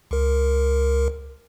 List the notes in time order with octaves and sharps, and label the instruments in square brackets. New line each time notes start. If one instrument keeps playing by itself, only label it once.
[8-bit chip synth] C#2 A#4